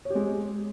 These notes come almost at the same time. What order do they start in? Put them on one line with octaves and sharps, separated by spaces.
C#5 G4 G#3